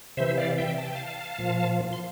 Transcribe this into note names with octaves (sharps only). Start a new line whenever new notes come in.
C3 E3 C5 E5
D5 F5
E5 G5
A5
G5
F5 A5
A#2 F3
C6